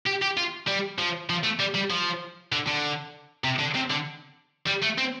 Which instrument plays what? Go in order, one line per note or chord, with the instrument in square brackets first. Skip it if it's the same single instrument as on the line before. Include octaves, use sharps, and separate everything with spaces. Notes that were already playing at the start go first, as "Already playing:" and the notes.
[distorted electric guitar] G4
G4
F4
G3
F3
F3
A3
G3
G3
F3
D3
D3
C3
D3
C3
D3
G3
A3
C4